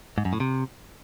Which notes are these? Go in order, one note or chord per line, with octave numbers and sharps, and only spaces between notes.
G#2
F#2
A2
C3